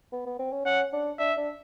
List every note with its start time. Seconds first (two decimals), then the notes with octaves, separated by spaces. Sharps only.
0.12 B3
0.26 B3
0.39 C4
0.52 C#4
0.65 C#4 F#5
0.93 D4
1.19 D4 E5
1.37 D4